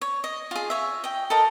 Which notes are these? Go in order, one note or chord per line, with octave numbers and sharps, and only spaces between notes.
C#5
D#5
F4 G#4
C#5 E5
D#5 G5
A4 A#4 D#5